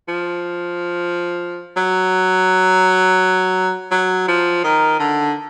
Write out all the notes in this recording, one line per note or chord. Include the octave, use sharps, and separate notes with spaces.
F3
F#3
F#3
F3
D#3
D3